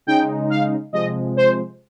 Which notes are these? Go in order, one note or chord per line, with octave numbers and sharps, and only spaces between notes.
C#3 G#3 D#4 G5
F5
C3 F3 G#3 D#5
C5